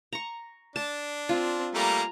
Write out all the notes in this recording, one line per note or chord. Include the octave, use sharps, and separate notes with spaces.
A#5 C#6
D4 A5
C4 F4
G3 A3 A#3 G#5 A#5